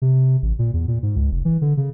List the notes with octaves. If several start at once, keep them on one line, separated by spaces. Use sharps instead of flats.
C3
A1
A#2
E2
A#2
G#2
C#2
F1
E3
D3
C#3